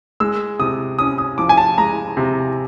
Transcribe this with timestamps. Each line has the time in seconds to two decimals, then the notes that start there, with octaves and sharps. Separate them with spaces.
0.20 G#3 E6
0.59 C3 D#6
0.99 C#4 D#6
1.18 D#6
1.38 F3 D6
1.49 G#5
1.57 A5
1.78 G#3 A#5
2.17 C3